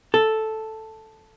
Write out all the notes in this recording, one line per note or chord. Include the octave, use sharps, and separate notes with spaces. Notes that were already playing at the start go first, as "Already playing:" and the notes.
A4